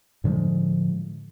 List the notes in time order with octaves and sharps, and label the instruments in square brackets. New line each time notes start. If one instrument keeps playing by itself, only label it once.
[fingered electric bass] A2 D3 F3 G#3